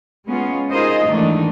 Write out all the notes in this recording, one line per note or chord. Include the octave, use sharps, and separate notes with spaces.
G#3 B3 C#4 F4
D#4 F4 G#4 A#4 C5 D#5
G#2 D#3 E3 A3 D4 D#4